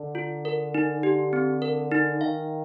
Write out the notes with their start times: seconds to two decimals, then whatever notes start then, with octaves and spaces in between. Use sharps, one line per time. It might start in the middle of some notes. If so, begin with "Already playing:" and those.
Already playing: D3
0.15 F4
0.45 A#4
0.74 D#4
1.03 G4
1.33 C4
1.62 A#4
1.91 D#4
2.21 D#3 F5